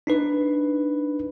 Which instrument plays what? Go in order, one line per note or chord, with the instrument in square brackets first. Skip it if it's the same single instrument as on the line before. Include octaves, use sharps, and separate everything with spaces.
[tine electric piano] D4 D#4 B4